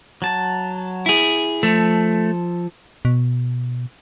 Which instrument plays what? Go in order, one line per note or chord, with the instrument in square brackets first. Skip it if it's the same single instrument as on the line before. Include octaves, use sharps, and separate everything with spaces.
[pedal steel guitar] F#3 A5
[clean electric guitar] E4 G#4
[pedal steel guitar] F3 A4 [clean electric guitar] A3
[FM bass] B2